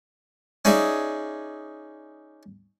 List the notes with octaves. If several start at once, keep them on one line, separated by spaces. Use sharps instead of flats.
C#4 D#4 G#4 D5 E5